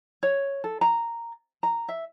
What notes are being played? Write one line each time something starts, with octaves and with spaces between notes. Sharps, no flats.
C#5
A4
A#5
A#5
E5